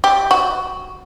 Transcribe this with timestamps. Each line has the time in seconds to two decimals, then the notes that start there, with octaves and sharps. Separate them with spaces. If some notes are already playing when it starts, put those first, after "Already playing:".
0.04 G4
0.31 F#4